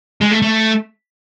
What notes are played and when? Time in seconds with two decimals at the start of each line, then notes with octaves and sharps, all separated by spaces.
0.21 G#3
0.31 A3
0.42 A3